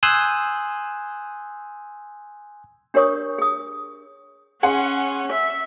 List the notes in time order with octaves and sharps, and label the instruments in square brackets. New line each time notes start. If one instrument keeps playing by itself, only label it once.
[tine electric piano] G#5 C6 D#6 E6 F#6 G6
[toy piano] D4 G4 A#4 C#5 C#6 D#6
G#4 D#6
[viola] C#4 [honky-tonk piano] G#4 F#5 C6
[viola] E5